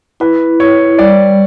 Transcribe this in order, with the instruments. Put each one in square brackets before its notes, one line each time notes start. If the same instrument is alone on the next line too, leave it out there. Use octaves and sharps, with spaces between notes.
[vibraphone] E4 [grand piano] B4
[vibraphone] E4 [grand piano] C#5
[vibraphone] G3 [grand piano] D5